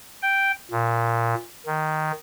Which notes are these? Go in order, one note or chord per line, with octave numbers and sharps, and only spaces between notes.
G5
A#2
D#3